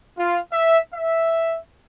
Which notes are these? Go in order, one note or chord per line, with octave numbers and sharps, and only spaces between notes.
F4
E5
E5